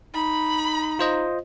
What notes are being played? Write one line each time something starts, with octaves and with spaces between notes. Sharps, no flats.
D#4 B5
F4 C5 D#5